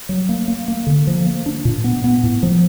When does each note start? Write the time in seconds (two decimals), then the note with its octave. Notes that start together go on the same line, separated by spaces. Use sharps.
0.09 F#3
0.29 A#3
0.48 A#3
0.68 A#3
0.87 D3
1.07 F3
1.26 A#3
1.46 D4
1.65 A#2
1.84 B3
2.04 B3
2.23 A2
2.43 F3